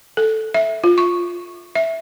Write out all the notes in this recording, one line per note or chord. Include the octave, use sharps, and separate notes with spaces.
A4
E5
F4
C#6
E5